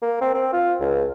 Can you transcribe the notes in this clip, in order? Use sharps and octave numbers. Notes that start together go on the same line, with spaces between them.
A#3
C4
C4
F4
C#2